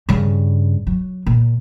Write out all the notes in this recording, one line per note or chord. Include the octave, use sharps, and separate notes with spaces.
G2 C#3
F#3
A#2